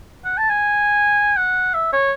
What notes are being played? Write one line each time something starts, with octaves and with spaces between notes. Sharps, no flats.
F#5
A5
G#5
F#5
E5
C#5